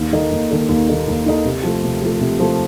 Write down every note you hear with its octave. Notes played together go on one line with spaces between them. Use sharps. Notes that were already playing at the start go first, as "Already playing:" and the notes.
Already playing: D#2
D#3 A#3 D#4 A4
D#2
D#3 A#3 D#4 A4
D#2
D#3 A#3 D#4 A4
D#2
D#3 A#3 D#4 A4
C3
F3 A3
C3
F3 A3
C3
F3 A3